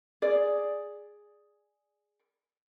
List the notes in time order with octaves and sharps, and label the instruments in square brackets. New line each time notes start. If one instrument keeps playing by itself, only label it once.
[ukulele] G#4 D5